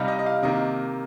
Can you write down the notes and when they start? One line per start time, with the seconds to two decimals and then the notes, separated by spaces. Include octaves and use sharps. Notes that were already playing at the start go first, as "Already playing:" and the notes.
Already playing: C3 G3 C4 D#4 F5
0.08 D#5
0.19 D#5
0.26 F5
0.43 C3 D#3 A#3 D#5